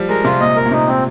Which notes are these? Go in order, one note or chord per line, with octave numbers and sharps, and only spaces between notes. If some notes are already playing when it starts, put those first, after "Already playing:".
Already playing: F3 G3
G#3 A#4
C3 F4
A#2 D#5
A#4
A#2
C3 D#4
C4